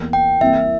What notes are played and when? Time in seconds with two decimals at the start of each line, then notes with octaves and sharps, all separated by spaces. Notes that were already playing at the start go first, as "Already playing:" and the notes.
Already playing: E2 E3 A#3
0.13 G5
0.41 C2 C3 E3 A#3 E5